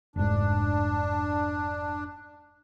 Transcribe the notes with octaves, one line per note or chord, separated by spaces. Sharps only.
F1 G#2 D4